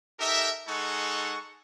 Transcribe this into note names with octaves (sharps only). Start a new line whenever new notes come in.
D#4 G4 A4 A#4 E5
G#3 D#4 G#4 A4 F#5 C#6